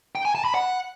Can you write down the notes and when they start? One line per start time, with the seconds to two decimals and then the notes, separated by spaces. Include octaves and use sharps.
0.15 G5
0.25 G#5
0.35 A5
0.45 B5
0.54 F#5